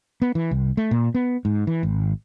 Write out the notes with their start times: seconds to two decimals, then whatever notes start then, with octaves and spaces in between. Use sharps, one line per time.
0.22 B3
0.35 E3
0.51 C2
0.77 A3
0.91 A#2
1.15 B3
1.45 G#2
1.67 E3
1.83 G#1